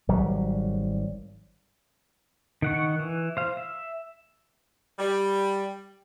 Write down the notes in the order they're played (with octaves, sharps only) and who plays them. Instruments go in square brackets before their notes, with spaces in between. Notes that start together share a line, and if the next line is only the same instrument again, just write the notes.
[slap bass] G#1 F#3 G3
[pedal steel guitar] D#3 F#5 C#6
E3
C5 F5
E5
[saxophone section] G3